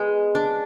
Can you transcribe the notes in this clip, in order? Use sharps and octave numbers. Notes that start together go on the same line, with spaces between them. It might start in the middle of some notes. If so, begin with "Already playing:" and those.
Already playing: G#3 B3
D4